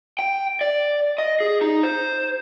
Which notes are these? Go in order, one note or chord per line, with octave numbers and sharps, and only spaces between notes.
G5
D5
D#5
G#4
D#4
C5